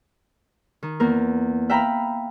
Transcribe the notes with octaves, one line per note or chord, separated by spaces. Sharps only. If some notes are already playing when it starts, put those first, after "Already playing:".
D#3
E2 A#3 A#4
E5 F5 G5 A#5 B5